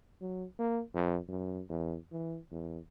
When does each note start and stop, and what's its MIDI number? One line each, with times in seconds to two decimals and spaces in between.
0.21 0.44 54
0.59 0.81 58
0.94 1.18 41
1.28 1.62 42
1.69 1.97 40
2.12 2.38 52
2.51 2.78 40